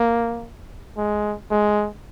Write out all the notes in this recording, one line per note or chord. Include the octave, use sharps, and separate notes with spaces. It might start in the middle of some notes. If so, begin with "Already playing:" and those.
Already playing: A#3
G#3
G#3